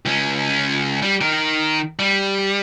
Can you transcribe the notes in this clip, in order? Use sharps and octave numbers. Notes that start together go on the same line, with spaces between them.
C#2 C#4
G3
D#3 A#4
G3